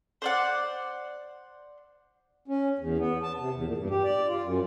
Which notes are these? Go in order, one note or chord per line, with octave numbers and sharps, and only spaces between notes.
C5 D5 F#5
C#4
E2
B3
A5
C3
E2
A#2
G2
G4
D5
F4
F#2